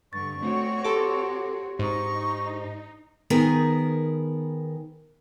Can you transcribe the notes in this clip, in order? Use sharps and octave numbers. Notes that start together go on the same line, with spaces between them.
G2 D3 C#6 A6
A3 C4 F#4 C#5
G4 A4 C6 D6
G#2 D#4 C#6
D#3 B3 G#4 A#4